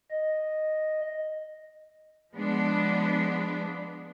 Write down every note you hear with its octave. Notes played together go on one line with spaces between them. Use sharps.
D#5
F3 G#3 B3 D4